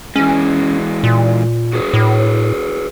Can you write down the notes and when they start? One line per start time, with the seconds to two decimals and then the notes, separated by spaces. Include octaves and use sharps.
0.16 E3 G#3 C#4
1.04 A#2
1.73 F#4 G#4 B4
1.94 A2